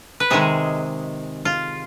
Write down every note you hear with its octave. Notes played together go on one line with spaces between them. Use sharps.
B4
C3 D#3 G#3 G#4
F4